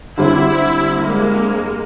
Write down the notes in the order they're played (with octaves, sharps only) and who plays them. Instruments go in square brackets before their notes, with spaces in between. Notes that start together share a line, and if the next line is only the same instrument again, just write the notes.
[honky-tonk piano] D3 G3 C4 [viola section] E4
[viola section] G#3 A#3